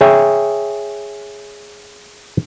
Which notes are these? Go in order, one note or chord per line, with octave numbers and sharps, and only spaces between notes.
G#4 C#5 E5 G5